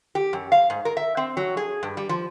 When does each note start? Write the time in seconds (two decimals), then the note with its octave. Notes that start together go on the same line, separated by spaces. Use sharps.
0.15 G4
0.33 F#2
0.52 F5
0.70 G#2
0.85 A#4
0.97 E5
1.17 C4
1.37 F#3
1.57 G#4
1.83 G2
1.97 G3
2.09 F3